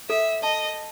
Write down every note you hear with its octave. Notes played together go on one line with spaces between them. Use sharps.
A4 E5
D#5 A5